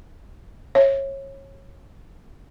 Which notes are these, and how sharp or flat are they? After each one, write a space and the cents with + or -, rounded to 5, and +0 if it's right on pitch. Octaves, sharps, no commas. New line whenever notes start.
C#5 -25 E5 +0